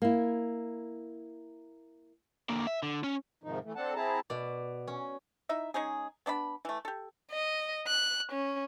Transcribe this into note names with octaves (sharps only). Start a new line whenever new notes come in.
A#3 E4
D3 A#3
E5
D3
C#4
G#2 C3 D#3 F3 D#4
E3 A3
C4 D4 A4 F#5 A5
C4 E4 G#4 A5 A#5
B2 D5
C#4
D#4 E4 E5
G#3 C#4 D#4 G#4
B3 D4 D5 B5
E3 A3
G4 A4
D#5
F#6
C#4